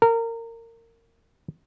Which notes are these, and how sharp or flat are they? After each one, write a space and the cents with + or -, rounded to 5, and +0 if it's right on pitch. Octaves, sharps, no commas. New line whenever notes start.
A#4 -25